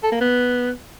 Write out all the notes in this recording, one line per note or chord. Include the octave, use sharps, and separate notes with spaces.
A4
A#3
B3